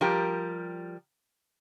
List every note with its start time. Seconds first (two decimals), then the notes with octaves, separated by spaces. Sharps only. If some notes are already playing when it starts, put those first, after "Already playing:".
0.01 F3 G3 G4 A#4